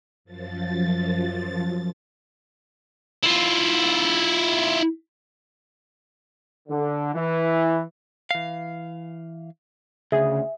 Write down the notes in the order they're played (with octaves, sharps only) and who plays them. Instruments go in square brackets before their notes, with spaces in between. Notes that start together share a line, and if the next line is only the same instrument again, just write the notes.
[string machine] F#2 F3 A6
[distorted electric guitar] E4 F4
[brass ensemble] D3
E3
[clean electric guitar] E3 F5
[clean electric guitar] D2 [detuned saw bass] C#3 [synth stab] G#4 [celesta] E5